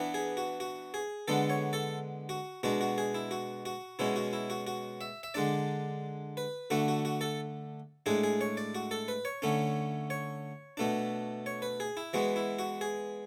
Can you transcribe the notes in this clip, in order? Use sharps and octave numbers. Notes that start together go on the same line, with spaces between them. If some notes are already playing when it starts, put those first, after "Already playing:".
Already playing: E3 B3 D4
G#4
F#4
F#4
G#4
D3 G#3 B3 D4 A4
C#5
A4
F#4
B2 G#3 D4 F#4
F#4
G#4
E4
F#4
F#4
B2 G#3 C#4 E4
F#4
E4
F#4
F#4
E5
E5
D3 G#3 D4 D5
B4
D3 A3 D4 F#4
F#4
F#4
A4
A2 G#3 D4 G#4
G#4
C#5
D5
F#4
A4
B4
C#5
D3 A3 C#4
C#5
B2 A3 D4
C#5
B4
G#4
E4
E3 G#3 B3 F#4
E4
F#4
G#4